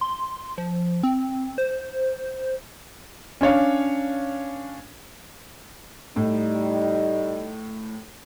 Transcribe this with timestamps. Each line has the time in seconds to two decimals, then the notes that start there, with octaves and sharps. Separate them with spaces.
0.01 C6
0.58 F3
1.03 C4
1.58 C5
3.41 C#4 D4 C#5 F5
6.16 A2 G3 D#4